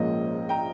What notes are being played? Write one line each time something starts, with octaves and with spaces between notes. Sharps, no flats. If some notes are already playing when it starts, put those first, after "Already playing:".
Already playing: A#1 G#2 F3 A#3 C#4 D#5
G5 A#5